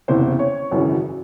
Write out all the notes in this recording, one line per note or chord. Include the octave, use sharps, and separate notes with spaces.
F#1 E2 C3 C5
C#5
G#1 F#2 C#3 E3